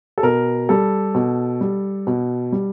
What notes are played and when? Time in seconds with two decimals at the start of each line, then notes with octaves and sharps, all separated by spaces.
0.18 A4
0.23 B2 A#4
0.69 G3 A4
1.15 B2
1.61 G3
2.07 B2
2.52 G3